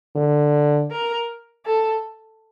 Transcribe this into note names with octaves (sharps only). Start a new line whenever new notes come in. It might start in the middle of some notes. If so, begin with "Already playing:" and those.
D3
A#4
A4